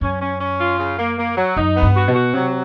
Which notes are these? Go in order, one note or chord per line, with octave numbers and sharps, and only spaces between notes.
F#2 C#4
C#4
C#4
F4
C#3
A#3
A#3
F#3
F#2 D#4
B3
G2
F#4
B2
F#4
C3 F#3